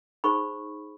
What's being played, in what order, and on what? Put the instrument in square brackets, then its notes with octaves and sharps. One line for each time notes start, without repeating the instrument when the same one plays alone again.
[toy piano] D#4 G#4 C5 B5 C#6